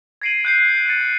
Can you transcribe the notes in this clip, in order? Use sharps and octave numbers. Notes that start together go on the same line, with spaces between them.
G#6 A#6 C7 D7 D#7 F#7
F#6 G6 C7
A6 C#7 D#7